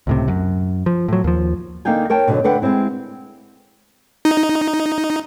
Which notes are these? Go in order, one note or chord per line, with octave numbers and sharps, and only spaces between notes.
C#2 A2 C3
F#2
F3
A2 F#3
D#2 F3
D3 A#3 D#4 F5 G5 G#5
A#4 C#5 G5 A5
B2 D3 F#3
D2 D3 B4 F#5 G5
G#3 A#3 C4 E4
D#4